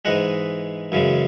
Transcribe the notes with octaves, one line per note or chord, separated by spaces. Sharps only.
G#2 E3 G#3 D#5 F#5
F#2 C#3 E3 G#3